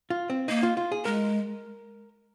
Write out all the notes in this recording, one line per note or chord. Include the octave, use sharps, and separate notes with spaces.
F4
C4
A#3 D#4
F4
F4
G#4
G#3 A#4